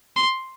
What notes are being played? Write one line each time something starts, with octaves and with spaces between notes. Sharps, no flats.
C6